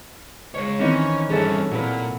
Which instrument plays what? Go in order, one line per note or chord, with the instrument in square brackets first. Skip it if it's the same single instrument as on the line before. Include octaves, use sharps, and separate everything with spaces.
[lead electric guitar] G#3 C#5
[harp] D#3 E3 C4 [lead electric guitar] C#4
[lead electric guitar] G2 C#4 [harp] G#4 A4 E5
[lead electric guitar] A#2 [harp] F#3 E4 B4